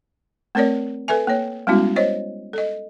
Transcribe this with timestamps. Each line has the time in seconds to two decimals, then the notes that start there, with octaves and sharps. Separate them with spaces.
0.55 A3 C4 A#4 C#5 D5
1.08 A4 B4 E5 G#5
1.27 A#3 C#5
1.67 G3 G#3 B3 C#4 E4 F#4
1.96 C5 C#5 D#5
2.53 A4 D#5